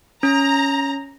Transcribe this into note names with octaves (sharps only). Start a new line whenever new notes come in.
C#4 A#5